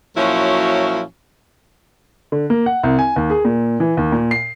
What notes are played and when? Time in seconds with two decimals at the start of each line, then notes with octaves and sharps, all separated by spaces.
0.16 A#2 F3 F#3 C#4 E4 F#4
2.32 D3
2.50 A#3
2.66 F#5
2.83 C2
2.99 G#5
3.16 D#2
3.30 G#4
3.45 A#2
3.80 E3
3.97 D#2
4.12 A#2
4.31 C7